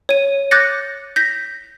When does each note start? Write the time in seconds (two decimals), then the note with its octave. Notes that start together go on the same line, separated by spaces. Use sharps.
0.09 C#5 D#7
0.51 D6 F#6 G6 A6 A#6 C#7
1.16 G6 A#6 B6